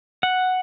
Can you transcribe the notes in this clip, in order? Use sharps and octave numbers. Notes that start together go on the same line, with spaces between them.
F#5